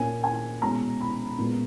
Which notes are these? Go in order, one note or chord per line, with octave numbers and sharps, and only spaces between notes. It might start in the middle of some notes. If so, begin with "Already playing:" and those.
Already playing: A#2 A#3 C#4 G#5
G#5
B2 G#3 C#4 A#5
B5
A#2 G#3 B3